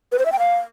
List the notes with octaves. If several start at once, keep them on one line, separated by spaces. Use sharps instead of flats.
B4
C5
E5
G5
F5